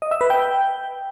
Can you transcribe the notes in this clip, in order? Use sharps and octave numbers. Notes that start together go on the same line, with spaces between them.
D#5
E5
B4
G5